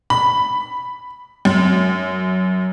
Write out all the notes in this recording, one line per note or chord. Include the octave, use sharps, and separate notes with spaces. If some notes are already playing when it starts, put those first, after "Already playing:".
B5
F#2